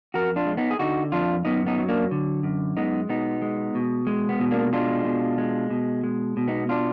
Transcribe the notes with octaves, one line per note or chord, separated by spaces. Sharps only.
F2 F#4 A#4
D4 F4
G#3
B3 D#4
G#4
D3 D#4 F#4
F2 D4 F4
F#2 B3 D#4
B3 D#4
F#3
A#3 D4
D3
F#2
G#3 B3 D#4
B2 B3 D#4
G#3
B2
G#3
B3
B2
A#3 D4
G#3 D4 F4
B2
G#3
B2
G#3
B2
B3 D#4
D4 F4